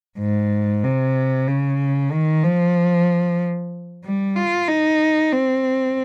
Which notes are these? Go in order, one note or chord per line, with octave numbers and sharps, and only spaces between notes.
G#2
C3
C#3
D#3
F3
G3
F4
D#4
C4